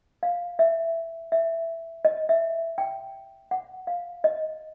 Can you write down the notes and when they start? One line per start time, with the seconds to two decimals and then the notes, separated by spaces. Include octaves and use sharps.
0.23 F5
0.59 E5
1.32 E5
2.05 D#5
2.29 E5
2.78 G5
3.51 F#5
3.87 F5
4.24 D#5